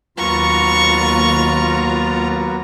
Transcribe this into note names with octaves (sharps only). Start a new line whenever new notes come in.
D#2 F#3 A#3 B3 F4 A#5 C#6